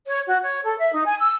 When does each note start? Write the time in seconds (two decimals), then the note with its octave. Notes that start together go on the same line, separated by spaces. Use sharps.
0.07 C#5
0.27 F#4
0.43 C#5
0.65 A4
0.79 E5
0.93 D#4
1.06 G#5
1.20 E6